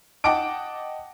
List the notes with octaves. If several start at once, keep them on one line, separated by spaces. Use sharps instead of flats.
D#5 F#5 G5 A5 D6 D7